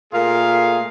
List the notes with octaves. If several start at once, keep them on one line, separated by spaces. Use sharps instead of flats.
A#2 A3 A#3 F4 G#4 F5